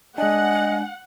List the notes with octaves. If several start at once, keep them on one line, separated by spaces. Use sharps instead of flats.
G#3 D4 D#5 F#5 G#5